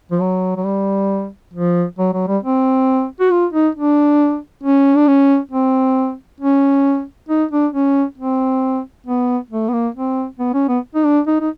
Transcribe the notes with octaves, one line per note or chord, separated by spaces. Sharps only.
F3
F#3
F#3
G3
F3
F#3
F#3
G3
C4
F#4
F4
D#4
D4
C#4
D4
C#4
C4
C#4
D#4
D4
C#4
C4
B3
A3
B3
A#3
C4
B3
C#4
B3
D#4
D4
D#4
D#4